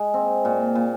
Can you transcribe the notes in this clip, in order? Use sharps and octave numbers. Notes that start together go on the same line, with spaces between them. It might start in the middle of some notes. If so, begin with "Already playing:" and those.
Already playing: G#3
C4
A#2
A#2